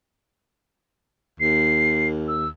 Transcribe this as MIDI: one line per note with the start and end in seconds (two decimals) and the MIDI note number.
1.40 2.48 39
1.40 2.08 96
2.28 2.48 88